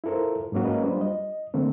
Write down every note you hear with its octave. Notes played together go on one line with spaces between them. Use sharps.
E4 F4 A4 A#4 C5
G#2 F#3 A#3 C#4 F#4
G#3 A#3 C#4 B4 D#5
F#3 G3 D4 F4 C5
D#5
D3 F3 A3 A#3 C4